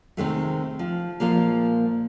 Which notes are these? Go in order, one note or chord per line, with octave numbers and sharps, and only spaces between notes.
C3 D#3 G#3 A3
F3
A#2 F3 G#3 A#3